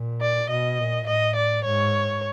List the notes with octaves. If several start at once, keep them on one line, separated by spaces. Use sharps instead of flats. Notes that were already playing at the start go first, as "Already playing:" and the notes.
Already playing: A#2
D5
B2 D#5
A#2
A2 D#5
D5
G#2 C#5